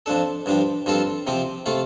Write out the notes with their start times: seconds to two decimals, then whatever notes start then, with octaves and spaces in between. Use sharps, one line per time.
0.06 F2 F3 D4 A4
0.46 G2 F3 D4 G4
0.86 G2 F3 C4 F4 A4
1.27 C3 F3 C4 G4
1.66 C3 A3 F4